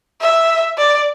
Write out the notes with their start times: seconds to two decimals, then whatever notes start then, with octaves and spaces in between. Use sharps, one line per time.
0.21 E5
0.78 D5